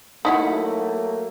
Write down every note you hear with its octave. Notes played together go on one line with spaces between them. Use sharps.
F#3 A3 A#3 D#4 E4 F#4